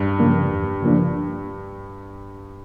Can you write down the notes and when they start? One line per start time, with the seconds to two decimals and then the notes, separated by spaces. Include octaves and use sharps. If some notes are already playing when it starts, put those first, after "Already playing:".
Already playing: G2
0.19 C#3 F3 A#3 D4
0.51 E2
0.83 C#3 F3 A#3 D4